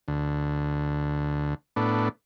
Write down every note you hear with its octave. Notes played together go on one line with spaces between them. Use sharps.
D2
A2 B3 D4